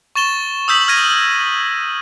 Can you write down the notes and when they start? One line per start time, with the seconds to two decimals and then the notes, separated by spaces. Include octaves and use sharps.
0.16 C#6 A6 E7 G7
0.68 D#6 E6 G6 B6 F#7
0.88 F6 G#6 A#6 D#7